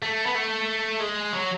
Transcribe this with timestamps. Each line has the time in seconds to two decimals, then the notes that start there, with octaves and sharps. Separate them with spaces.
0.03 A3
0.26 B3
0.35 A3
1.00 G#3
1.33 F#3